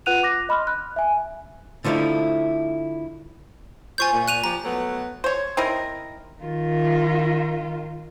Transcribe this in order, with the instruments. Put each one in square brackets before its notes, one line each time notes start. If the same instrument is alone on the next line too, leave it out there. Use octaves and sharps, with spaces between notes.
[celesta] F4 B4 F#5 F#6 D#7 F7
D6 F#6 A#6
D#5 B5 C6 F6
F#6
E5 G#5
[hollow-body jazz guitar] D3 F3 A3 D#4 E4
[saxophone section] F4 C5 [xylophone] G#5 C#6 G6
[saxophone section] A#2
[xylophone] F#6 D#7 F7
[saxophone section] F3 G4 [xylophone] A#5
[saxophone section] F#3 A3 B3
[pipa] C5 C#5
C4 D#4 E4 A#4
[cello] D#3 F4